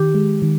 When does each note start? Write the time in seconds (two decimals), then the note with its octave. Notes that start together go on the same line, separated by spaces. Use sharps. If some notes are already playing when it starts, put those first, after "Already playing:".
Already playing: D#3 G4
0.15 G#3
0.42 D#3